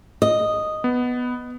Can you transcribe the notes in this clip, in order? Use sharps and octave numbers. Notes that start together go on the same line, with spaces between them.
D#5
B3